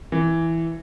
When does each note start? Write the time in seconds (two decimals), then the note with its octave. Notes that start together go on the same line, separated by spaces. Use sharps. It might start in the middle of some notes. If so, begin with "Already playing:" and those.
0.12 E3